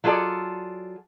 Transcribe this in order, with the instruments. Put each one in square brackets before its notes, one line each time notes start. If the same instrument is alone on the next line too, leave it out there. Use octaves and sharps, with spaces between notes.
[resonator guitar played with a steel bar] F#3 F4 G#4 A4 D5